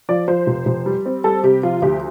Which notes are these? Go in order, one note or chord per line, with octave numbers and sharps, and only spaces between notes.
F3 D5
F3 C5
F1
F1
G3
C4
G3 A4
C3 G4
F3 F4
D2 G4